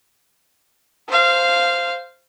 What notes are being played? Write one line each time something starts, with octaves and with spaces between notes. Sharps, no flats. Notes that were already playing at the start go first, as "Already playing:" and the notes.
C5 F5